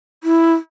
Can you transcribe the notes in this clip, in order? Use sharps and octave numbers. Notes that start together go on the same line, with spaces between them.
E4